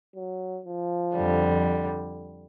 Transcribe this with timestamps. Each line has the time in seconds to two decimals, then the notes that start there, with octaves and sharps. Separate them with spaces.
0.15 F#3
0.66 F3
1.15 F2 D3 G3